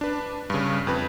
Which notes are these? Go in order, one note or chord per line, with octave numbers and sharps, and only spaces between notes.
D4 B4
G2 C#3
F2 B4